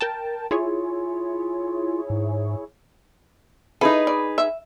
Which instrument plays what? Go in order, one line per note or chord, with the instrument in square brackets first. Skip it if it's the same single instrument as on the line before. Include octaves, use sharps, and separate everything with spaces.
[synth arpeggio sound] A#4 G5 A5
[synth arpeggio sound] E4 G#4 C#5 [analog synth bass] F4
[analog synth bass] G#2
[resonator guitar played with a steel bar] D#4 G#4 B4 [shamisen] E4 A4
[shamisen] D5
E5